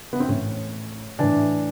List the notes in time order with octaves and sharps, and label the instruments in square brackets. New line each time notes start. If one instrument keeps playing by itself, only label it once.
[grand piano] B3
C4
A2 E3 C#4
A2 E3 D4